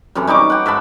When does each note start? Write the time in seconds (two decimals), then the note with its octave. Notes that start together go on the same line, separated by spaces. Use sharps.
0.15 F#2 C3 E3 A4
0.27 G3 D#4 C#6 D6
0.50 F#5 G5
0.66 G#2 E5 A5 B5